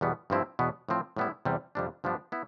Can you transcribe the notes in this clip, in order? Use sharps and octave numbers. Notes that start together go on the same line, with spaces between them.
E2 B2 G3 B3
G2 F3 C4 E4
E2 B2 B3
A2 F3 C4
A2 G3 B3 E4
E2 C3 G3
F2 C3 G3 D4
G2 F3 B3 D4
B3 E4